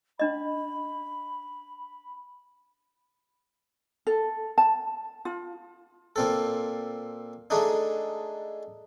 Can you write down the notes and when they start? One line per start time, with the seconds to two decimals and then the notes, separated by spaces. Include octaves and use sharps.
0.19 C#4 D4 D#5 B5
4.07 A4
4.58 A5
5.25 F4
6.16 A#2 C4 A4
7.50 G#3 A3 D4 D#4